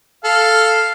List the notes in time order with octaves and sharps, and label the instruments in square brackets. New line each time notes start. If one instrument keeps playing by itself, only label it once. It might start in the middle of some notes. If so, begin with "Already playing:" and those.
[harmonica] A4 F5